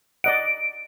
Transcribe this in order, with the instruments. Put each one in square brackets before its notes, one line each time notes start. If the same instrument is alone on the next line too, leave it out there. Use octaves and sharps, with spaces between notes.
[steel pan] D5 D#5 F#5 [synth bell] D7